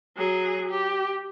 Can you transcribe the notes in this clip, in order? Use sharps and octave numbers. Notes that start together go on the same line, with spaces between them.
F#3 G#4
G4